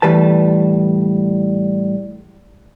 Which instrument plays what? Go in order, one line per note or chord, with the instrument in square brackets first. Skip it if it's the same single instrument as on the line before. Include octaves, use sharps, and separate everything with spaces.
[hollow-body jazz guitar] A2 E3 G3 B4 A5